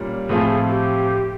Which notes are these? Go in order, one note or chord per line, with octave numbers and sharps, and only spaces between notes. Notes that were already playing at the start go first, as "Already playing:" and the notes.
Already playing: A#2 G3 A#3 C#4
A2 F3 A3 C4 F4 G#4
G4